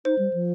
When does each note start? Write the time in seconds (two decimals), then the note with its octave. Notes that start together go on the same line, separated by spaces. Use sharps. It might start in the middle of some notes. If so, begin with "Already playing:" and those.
0.05 D#4 C5
0.19 G3
0.33 F3